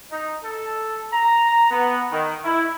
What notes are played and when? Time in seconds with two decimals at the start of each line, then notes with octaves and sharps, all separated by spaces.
0.11 D#4
0.43 A4
1.12 A#5
1.70 B3
2.11 D#3
2.44 E4